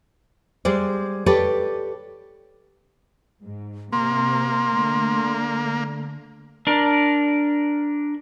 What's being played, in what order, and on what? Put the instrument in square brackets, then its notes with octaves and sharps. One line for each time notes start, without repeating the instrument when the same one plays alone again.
[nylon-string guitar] G3 G#3 C5 D5
G4 A4 B4 C#5 D5
[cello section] G#2
[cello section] C3 [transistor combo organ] A#3 [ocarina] C6
[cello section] D3 A3
[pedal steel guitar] D4 A#4